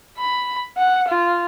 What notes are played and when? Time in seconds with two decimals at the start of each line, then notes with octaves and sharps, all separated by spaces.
0.17 B5
0.78 F#5
1.08 F4